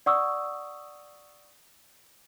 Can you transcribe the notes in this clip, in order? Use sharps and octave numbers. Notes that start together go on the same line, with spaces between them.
D5 F#5 C#6 D#6 E6